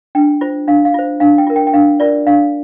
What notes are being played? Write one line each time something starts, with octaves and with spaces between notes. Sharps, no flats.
D4 G5
F4 C5
D4 F5
F5
F4 C5
D4 F5
G5
F4 A#4
G5
G5
D4 F5
F4 A#4 D5
D4 F5